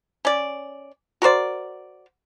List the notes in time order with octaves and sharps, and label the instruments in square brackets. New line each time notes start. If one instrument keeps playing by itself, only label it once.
[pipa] C#4 D5
F#4 A#4 C5 D5